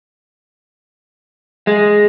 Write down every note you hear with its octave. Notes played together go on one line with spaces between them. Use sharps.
G#3